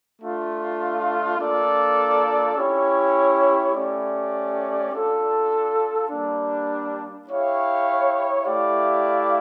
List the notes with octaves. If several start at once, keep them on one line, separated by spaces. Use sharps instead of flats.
A3 D4 F4
A#3 D4 F4 A4 D5
C#4 E4 G4 C#5
A3 C#4 G4 D5
D4 F4 A4
G3 A#3 D4
E4 G4 C#5 F5
A3 E4 G4 D5 F5